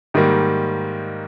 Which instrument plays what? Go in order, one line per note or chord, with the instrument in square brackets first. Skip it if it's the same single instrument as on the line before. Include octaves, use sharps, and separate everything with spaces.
[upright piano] G#2 D#3 G3 A#3